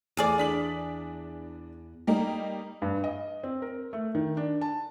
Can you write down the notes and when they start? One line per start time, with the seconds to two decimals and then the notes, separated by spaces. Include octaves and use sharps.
0.17 E2 A3 G#4 D5
0.38 D4 B6 F#7
2.07 G3 A#3 D#4
2.82 G2
3.04 D#5
3.43 C4
3.62 A#4
3.93 A3
4.15 D#3
4.37 D4
4.61 A5